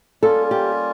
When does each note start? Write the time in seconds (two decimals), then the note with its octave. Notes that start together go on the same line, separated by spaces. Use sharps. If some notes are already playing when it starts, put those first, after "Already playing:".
0.22 G3 A#3 C#4 F4 A4
0.51 G4